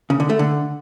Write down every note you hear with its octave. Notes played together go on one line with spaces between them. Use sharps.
C#3
D3
A3
D3